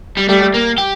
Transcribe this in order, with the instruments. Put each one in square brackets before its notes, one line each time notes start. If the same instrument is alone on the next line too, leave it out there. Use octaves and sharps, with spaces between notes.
[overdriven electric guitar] G3
[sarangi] G3 [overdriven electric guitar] A3
[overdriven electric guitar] A#3
G4